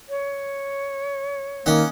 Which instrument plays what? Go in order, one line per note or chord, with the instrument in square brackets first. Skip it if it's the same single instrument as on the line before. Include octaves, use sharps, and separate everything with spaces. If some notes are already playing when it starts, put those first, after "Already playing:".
[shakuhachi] C#5
[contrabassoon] D#3 [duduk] A#3 [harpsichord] C#4 D#5 F#5